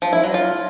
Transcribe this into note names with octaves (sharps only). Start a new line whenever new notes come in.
F3
E4
F#3
F4